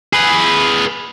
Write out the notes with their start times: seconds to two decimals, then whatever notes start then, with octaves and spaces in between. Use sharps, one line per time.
0.13 G#4 B4